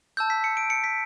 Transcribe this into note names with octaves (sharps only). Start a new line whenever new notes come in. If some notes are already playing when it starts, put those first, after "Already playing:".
A5 E6 G6
B6
C#7
D7
C#7
B6